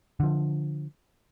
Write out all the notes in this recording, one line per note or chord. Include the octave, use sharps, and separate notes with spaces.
D3 F3